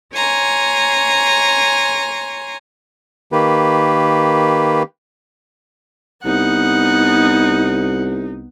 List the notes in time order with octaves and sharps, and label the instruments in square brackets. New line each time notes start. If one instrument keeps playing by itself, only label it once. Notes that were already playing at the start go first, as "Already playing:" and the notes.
[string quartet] C#5 G#5 A#5 C6
[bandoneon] D#3 A#3 G4 B4
[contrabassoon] C2 [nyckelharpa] B3 F#5 [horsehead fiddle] D#4